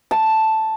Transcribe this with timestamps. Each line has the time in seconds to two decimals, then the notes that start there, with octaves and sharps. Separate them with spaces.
0.11 A5